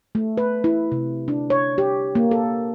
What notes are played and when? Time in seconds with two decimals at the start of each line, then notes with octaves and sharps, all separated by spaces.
0.15 A3
0.37 B4
0.64 E4
0.92 C3
1.28 D4
1.50 C#5
1.78 G4
2.15 A#3
2.31 A4